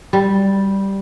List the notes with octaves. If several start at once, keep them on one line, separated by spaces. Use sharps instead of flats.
G3